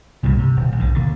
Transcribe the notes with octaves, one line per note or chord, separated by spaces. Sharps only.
C2 G2 A#2 C#3
C3
D#1
B1 G#2 D#3
D#2 D3